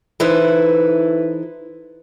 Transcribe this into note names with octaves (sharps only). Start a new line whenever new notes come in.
E3 D#4 E4 A4 B4 C5